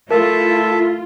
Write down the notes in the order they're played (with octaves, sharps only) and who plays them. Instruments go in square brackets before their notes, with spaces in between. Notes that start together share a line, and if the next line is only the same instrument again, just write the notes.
[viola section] A3 E4 [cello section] F4 [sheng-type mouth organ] A4 E5 A5 [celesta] A#4